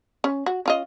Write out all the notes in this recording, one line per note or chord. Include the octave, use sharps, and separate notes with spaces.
C#4
F#4
C#4 F4 D#5